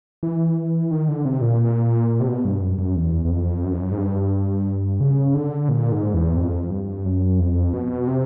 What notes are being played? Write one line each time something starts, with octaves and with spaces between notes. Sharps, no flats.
E3
D#3
D3
C3
A#2
C3
B2
G2
F#2
F#2
E2
E2
F2
F#2
F2
F#2
G#2
G2
C#3
D3
A#2
G#2
E2
F2
G2
F#2
F2
B2
C3